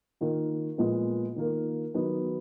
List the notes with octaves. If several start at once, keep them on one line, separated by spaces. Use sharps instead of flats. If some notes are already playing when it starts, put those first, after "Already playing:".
D#3 A#3 F4
A#2 F3 G#3 B3 F4
D#3 A#3 F4
D#3 F#3 B3 D#4